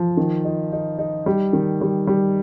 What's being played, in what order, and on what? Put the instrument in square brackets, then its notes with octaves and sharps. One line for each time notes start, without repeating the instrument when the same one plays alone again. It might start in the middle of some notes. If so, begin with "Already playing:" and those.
Already playing: [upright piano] F3
D#3
D#4
D#4
D#4
G3
D#3
G3
G3